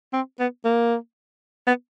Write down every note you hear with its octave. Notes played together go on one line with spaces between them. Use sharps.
C4
B3
A#3
B3